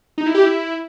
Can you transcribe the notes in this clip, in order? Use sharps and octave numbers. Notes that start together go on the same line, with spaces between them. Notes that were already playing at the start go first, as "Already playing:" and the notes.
D#4
E4
G4
E4